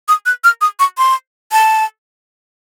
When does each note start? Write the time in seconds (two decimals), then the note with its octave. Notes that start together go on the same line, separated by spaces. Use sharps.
0.08 D#6
0.26 F#6
0.44 F6
0.61 D#6
0.79 C#6
0.98 C6
1.52 A5